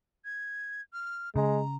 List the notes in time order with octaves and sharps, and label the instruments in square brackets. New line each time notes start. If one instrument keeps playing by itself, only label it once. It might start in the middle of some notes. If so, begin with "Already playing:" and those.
[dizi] G#6
F6
[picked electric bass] C#3 [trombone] G#3 [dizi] A#5